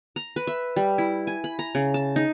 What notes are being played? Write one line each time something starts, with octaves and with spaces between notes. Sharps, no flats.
A#5
B4
E5
G3
E4
G#5
B5
A#5
C#3
A5
D#4